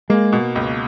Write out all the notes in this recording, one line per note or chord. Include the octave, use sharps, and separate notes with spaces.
G#3 A#3
B2
C#2